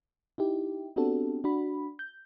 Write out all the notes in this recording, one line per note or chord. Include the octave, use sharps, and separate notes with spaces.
D#4 E4 G4
B3 C4 D4 F#4 G4 A4
D4 F#4 B5
G6